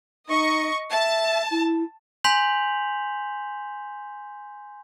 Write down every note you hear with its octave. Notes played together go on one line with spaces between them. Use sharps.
D#4 D#5 C#6
E5 A5
E4
G#5 C6 G6 B6 F7 F#7